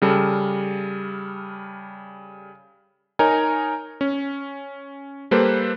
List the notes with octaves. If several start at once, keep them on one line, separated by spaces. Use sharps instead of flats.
C#3 G3 A4
D#4 A#4 C#5 G#5 A#5
C#4
G3 A#3 A4 B4 C5